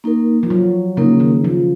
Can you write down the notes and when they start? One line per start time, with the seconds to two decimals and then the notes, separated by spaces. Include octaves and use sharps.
0.04 A#3 D#4 A#4
0.43 F3
0.50 F#3
0.97 C#3 A#3 D#4 A#4
1.20 D#3
1.44 F3